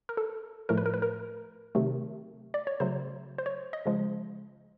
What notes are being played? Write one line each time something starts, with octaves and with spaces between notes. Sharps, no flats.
A#4
A4
A2 F3 A3 A#4
B4
A#4
B4
A#4
C3 D#3 F#3 A3
D5
C#5
C#3 F#3 A3 C5
C5
C#5
D#5
C#3 F3 G#3